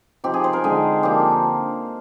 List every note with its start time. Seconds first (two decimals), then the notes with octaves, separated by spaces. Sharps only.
0.24 F3 C4 D#4 G4
0.34 G#4
0.44 C5
0.53 A#4
0.64 D3 G#3 D#4 G#4
1.03 F3 A#3 D4 G4